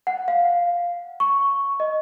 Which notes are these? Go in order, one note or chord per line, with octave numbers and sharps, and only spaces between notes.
F#5
F5
C#6
D#5